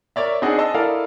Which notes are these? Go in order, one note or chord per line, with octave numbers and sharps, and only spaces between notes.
A#4 C#5 D5 E5
C4 D4 D#4 G#4 D#5 F#5
D#5 A5 D#6 E6
E4 A4 A#4 D5 F5